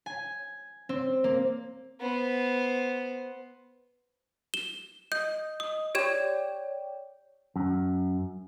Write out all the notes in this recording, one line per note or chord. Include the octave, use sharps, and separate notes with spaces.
G#5
C4
A#3
B3 C5
E7 G7
D#5 G6
D#6
G4 C#5 D5 G5 G#6 E7
F#2